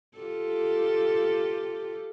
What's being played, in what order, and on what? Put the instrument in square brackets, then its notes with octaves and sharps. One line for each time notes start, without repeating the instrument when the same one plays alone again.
[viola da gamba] F4 G4 A4